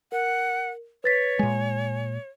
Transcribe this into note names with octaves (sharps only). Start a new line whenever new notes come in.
A#4 F#5
B4 C#5 A6 B6
A#2 G#3 G#5